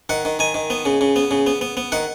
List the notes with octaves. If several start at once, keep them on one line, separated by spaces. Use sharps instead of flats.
D#3 F#5
D#3
D#3 G#5
D#3
B3
C#3
C#3
B3
C#3
B3
B3
B3
D#3 F#5